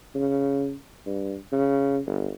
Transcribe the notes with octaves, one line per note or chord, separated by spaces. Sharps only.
C#3
G2
C#3
G1